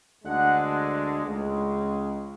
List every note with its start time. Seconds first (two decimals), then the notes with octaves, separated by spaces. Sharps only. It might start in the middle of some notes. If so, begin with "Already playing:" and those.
0.24 D2 D3 G#3 D4 F#5
1.25 C#2 C#3 G#3